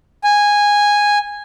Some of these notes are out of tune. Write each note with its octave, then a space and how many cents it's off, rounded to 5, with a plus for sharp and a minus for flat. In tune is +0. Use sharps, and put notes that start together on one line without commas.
G#5 -10